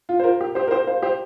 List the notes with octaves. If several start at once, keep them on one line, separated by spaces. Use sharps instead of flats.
F4
C5
F4 A#4
G4
G4 C5
A#4
G4 C5
C5 F5
G4 C5